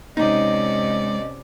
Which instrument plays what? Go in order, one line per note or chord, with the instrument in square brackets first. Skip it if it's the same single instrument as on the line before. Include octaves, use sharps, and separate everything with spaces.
[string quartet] C3 C#4 D5 [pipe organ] G#3 [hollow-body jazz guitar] D#4 [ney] D#5